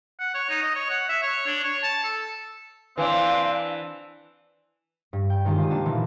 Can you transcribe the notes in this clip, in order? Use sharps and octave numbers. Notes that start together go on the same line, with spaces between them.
F#5
C#5
D#4
D#5
C#5
F#5
E5
C#5
D4
C#5
A5
A4
E3 C4 D4 F5
G2
G5
C3 D#3 G#3 A#3 D4 G4
F4 D5 D#5
A#3 D4 F#5 A5
A#2 E3